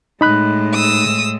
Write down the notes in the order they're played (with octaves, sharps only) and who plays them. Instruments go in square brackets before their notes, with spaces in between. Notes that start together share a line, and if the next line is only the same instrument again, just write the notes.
[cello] A2 G#3 [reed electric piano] D#4 B5 F#6
[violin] D#6 E6